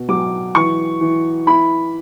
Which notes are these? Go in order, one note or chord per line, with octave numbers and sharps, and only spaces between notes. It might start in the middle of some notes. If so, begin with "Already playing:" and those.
Already playing: B2
F#3 D6
E3 C#6
E3
E4 B5